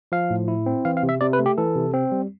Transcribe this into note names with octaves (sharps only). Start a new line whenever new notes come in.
F3 F5
A2
E4
C4
E3 F5
F5
C3
E5
C3 D5
B4
A3
G4
E3 A4
C3
C4
G3